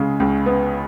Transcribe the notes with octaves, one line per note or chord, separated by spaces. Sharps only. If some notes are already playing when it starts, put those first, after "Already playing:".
Already playing: C#2 C#3 G#3
C#2
B3